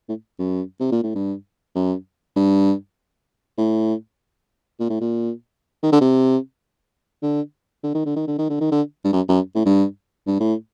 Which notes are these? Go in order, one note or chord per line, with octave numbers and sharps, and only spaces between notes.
A2
F#2
C3
A#2
A2
G2
F#2
G2
A2
A#2
A2
A#2
D#3
D3
C3
D3
D3
D#3
D3
D#3
D3
D#3
D3
D#3
D3
G2
F#2
F#2
A2
G2
G2
A2